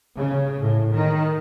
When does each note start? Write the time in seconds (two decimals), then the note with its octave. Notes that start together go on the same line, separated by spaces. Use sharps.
0.17 C#3
0.60 A2
0.93 D#3